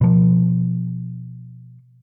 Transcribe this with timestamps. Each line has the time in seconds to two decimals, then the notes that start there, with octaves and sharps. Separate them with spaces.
0.01 B2 F3